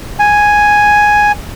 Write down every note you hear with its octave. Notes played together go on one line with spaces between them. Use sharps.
G#5